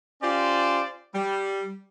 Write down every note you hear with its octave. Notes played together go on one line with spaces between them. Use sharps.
C#4 F4 G4 C5 D5
G3